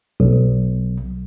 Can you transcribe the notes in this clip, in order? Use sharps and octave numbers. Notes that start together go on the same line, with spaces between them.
B1